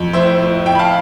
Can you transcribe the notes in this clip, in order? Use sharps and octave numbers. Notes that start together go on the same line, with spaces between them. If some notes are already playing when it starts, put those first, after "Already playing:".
Already playing: F2
A2 C5 E5
A2
F2 E5 G5
B5
F5 A5